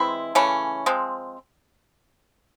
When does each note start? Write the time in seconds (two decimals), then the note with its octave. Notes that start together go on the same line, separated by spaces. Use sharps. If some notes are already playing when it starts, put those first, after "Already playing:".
Already playing: E3 G#3 C4 E4
0.35 C#3 E3 A3 C#4
0.86 F3 G#3 C4